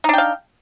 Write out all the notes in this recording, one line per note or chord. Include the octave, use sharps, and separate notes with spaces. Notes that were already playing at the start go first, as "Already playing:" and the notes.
D4 D#4 F5 G5